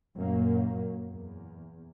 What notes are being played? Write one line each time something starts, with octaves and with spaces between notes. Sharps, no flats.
F#2 A#2 F#3 A#3
E2